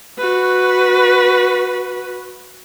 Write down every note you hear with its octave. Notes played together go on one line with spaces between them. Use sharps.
F#4 B4